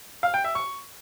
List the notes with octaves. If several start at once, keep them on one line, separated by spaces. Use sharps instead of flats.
F5
G5
E5
C#6